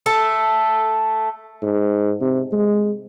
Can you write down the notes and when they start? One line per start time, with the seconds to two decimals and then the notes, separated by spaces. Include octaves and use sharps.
0.06 A3 A4 A5
1.63 G#2
2.21 C3
2.52 G#3